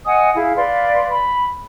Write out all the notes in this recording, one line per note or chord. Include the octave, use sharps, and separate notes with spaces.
D#5 F#5 G#5 D#6
E4 G#4 F5
B4 D5 F5 C6
B5